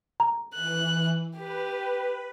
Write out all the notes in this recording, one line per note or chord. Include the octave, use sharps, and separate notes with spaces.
A#5
E3 F#6
G4 B4